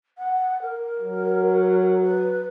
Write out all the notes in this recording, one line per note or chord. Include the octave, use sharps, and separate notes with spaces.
F#5
A#4
F#3
B4